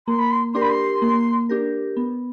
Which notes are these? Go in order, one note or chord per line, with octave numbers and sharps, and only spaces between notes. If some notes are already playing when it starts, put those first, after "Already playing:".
A#3 C6
B5
C6
D4 G4 A#4 C6
B5
C6
A#3
D4 G4 A#4
B3